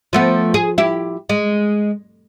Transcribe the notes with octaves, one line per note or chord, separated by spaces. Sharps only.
F3 A3 B3
G#4
E4 G4
G#3